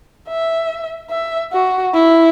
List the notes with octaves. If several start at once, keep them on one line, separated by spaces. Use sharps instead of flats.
E5
E5
F#4
E4